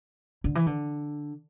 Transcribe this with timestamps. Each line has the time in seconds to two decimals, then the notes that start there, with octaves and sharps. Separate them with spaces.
0.44 D3
0.55 E3
0.66 D3